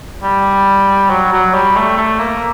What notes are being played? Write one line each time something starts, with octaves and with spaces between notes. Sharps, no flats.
G3
F#3
F#3
G3
A3
A3
A#3